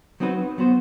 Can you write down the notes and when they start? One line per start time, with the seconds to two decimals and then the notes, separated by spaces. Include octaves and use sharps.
0.20 F#3 C4 D#4 F#4 B4
0.58 F#3 B3 F#4 C5